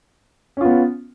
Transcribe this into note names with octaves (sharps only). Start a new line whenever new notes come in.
B3 C#4 F4